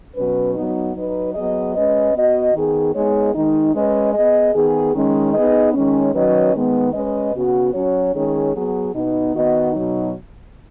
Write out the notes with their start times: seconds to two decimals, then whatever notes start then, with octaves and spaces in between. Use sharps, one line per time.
0.15 B2 F#3 C#4 B4
0.55 F#3 B3 D#4
0.95 F#3 D#4 B4
1.35 F#3 B3 G#4 D#5
1.75 G#3 C#4 B4 D#5
2.15 B3 F#4 D#5
2.54 D#3 B3 G#4
2.94 G#3 B3 D#4 G#4 C#5
3.35 D#3 G#3 D#4
3.74 G#3 C#4 B4 D#5
4.14 B3 G#4 D#5
4.54 D#3 B3 G#4
4.94 D#3 G#3 C#4
5.34 B3 D#4 G#4 B4 D#5
5.74 D#3 G#3 C#4
6.14 D#3 F#3 C#4 B4 D#5
6.53 D#3 G#3 B3
6.94 G#3 C#4 B4 D#5
7.33 C#3 B3 F#4
7.74 F#3 C#4 F#4 C#5
8.13 D#3 G#3 C#4 G#4 C#5
8.53 F#3 B3 G#4
8.93 B2 B3 D#4
9.33 D#3 B3 F#4 D#5
9.73 B2 F#3 D#4